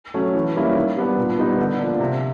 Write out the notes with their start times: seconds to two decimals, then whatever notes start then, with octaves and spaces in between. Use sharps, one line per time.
0.14 F#3 A3 C#4
0.35 E3
0.56 G3 A#3 C#4 E4
0.76 D#3
0.97 G3 B3 D4
1.18 A#2
1.38 G3 B3 D#4
1.59 D3
1.79 F3 A#3 D4
2.00 C3